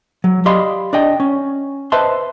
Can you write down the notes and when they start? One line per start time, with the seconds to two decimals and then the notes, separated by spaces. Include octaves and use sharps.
0.24 F#3
0.46 G4 D5 D#5 F5 B5 C6
0.93 D4 D5 D#5 G5
1.20 C#4
1.92 B4 C5 D#5 E5 A5 C6